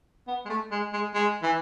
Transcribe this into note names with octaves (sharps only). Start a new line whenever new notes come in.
B3
G#3
A3
G#3
G#3
G#3
E3